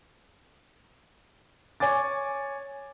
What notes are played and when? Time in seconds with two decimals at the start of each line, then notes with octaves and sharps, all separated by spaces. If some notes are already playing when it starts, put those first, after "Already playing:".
1.80 C#5 G#5 D6 A6